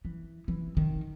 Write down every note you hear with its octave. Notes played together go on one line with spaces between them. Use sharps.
E3
E3
D#3